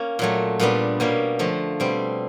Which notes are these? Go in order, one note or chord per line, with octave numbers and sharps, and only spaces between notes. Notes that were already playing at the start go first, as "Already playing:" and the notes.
Already playing: A#3 C#4
A#2 F#3 A3
A#2 G3 B3 D4
B2 G3 A#3 C#4
D3 F3 A3
B2 G3 C4